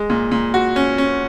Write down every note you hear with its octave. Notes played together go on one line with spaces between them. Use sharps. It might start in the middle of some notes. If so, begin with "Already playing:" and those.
Already playing: G#3
A#2
A#2
F#4
C#4
C#4